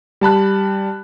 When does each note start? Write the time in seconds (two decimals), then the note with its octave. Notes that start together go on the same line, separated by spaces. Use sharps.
0.21 G3 A5 B5 F#6